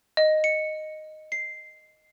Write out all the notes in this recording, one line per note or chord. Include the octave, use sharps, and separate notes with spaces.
D#5
C#7
C7